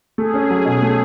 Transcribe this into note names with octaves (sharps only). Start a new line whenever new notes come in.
A3 G#4
C#4
F#3
B2
A3